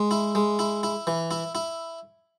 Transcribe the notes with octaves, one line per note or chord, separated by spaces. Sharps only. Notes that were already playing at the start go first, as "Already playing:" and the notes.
Already playing: G#3
E4
G#3
E4
E4
E3
E4
E4